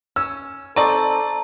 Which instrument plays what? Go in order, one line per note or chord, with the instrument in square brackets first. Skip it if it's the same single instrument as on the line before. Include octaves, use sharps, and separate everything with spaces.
[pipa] C#4 [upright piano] E6
[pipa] C4 D#4 A5 [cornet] A4 [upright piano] D5 C#6 [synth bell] A#5